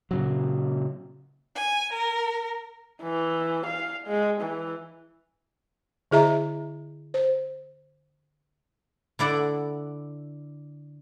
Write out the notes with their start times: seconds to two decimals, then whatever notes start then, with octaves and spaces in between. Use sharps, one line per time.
0.11 A#2 C#3 F#3
1.54 G#5
1.92 A#4
3.03 E3
3.66 F5
4.07 G#3
4.41 E3
6.11 D3 E4 G#4 D#5 E5 A#5
7.14 C5
9.19 D3 E4 D5 F#5